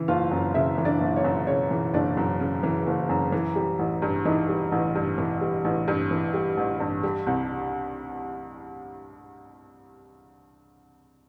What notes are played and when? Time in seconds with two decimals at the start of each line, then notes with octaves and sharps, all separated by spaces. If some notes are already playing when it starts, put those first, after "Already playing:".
Already playing: C#3 E3
0.08 F#1 F4 F5
0.31 F#2
0.54 C#3 E4 E5
0.78 E3
0.85 D4 D5
1.01 F#1
1.16 C#5
1.24 F#2
1.47 C#3 C#5
1.71 E3
1.93 F#1 D4 D5
2.17 F#2
2.40 C#3
2.63 E3
2.86 F#1
3.09 F#2
3.32 E3
3.56 G3
3.79 A1
4.02 G2
4.25 E3 D#4 D#5
4.49 G3
4.72 A1
4.95 G2
5.18 E3
5.41 G3
5.64 A1
5.88 G2
6.11 E3
6.34 G3
6.57 A1
6.80 G2
7.03 G3
7.27 C2